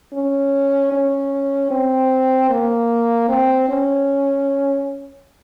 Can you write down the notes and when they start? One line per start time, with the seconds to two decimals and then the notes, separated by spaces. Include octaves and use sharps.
0.14 C#4
0.92 C#4
1.71 C4
2.50 A#3
3.29 C4
3.69 C#4